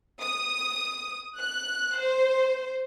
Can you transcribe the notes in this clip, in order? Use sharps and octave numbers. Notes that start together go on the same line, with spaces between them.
D#6
F#6
C5